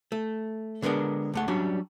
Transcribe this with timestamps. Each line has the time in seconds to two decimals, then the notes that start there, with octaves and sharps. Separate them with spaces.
0.12 A3
0.82 D3 G#3 B3 D4 A#4
1.34 C#2 A3 F#5
1.48 F#3 G3 C#4 D4 F#4